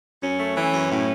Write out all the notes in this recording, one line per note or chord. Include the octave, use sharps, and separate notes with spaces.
F#2 C#4
A3
E3 C#4
F#2
A2